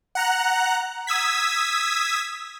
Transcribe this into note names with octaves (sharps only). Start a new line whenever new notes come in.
F#5 A#5 F#6
D#6 E6 G#6 B6